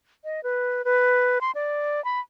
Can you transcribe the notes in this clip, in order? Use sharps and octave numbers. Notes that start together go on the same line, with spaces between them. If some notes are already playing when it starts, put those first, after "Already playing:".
D#5
B4
B4
C6
D5
B5